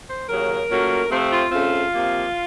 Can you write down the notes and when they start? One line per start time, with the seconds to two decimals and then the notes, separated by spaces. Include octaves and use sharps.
0.08 C5
0.29 D#2 C#3 F#3 A#4
0.69 A#2 F#3 A3 C#4
1.11 C3 F3 A3 C4
1.32 F4
1.52 C#3 A3 C4 F4
1.93 C3 F3 A#3